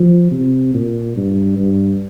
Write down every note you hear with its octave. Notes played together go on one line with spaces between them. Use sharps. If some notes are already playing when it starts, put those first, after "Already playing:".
Already playing: F3
C3
A#2
G2
G2